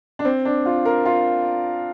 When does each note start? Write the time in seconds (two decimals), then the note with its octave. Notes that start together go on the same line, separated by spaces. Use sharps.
0.19 D4
0.25 C4
0.45 D4
0.66 F4
0.85 A#4
1.06 F4